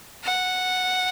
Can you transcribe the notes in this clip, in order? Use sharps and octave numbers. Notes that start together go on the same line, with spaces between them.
F#5